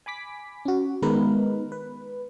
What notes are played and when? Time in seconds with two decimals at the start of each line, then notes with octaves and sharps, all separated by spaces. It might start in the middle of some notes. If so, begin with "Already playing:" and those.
0.06 G#5 B5 D6 B6
0.65 C#4 F#4
1.02 D#3 G#3 B3 D#4 A#4 B4
1.72 B4